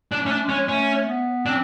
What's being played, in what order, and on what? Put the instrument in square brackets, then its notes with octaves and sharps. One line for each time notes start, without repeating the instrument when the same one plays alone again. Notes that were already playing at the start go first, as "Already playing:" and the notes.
[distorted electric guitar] D4
[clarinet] A3
[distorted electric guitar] C#4
D4
[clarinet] G#3
[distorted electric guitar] C#4
[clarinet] A3 [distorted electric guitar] C#4
[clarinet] B3
[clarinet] C4 [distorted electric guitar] D4